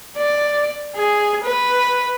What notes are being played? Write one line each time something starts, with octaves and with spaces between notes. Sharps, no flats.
D5
G#4
B4